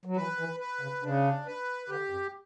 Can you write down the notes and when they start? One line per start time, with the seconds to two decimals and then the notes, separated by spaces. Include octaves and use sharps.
0.05 F#3
0.16 E3 B4
0.38 E3
0.60 B4
0.81 C#3
1.03 C#3 D4
1.46 B4
1.89 D3 G4
2.10 F#2